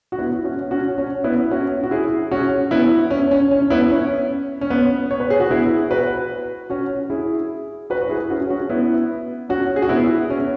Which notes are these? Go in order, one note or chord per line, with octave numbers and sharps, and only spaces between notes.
F#4
B3 E4
C#4 F#4
C#4 F#4
C#4
B3 E4
C#4 F#4
F#4
E4 G#4
C#4 F#4
B3 E4
C#4
C#4
C#4
B3 E4
C#4
C#4
B3
C#5
B4
G#4
F#4
B3 E4
F#4 B4
C#4 F#4
E4 G#4
F#4 B4
F#4
E4 G#4
C#4 F#4
C#4 F#4
B3 E4
C#4 F#4
G#4
F#4
B3 E4
C#4